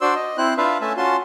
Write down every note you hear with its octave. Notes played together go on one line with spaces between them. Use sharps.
D4 F#4 C5 D5 C6 E6
D#5
C4 E4 C5 F#6
D4 F4 B4 E5 F5
A3 C#4 E5 G#5 A5
C#4 F4 F#4 A5 C6